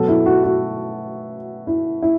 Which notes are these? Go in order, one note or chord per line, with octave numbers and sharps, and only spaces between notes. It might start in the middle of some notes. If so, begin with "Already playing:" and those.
Already playing: B2 F#3 B3 A4
E4
F#4
F#4
E4
E4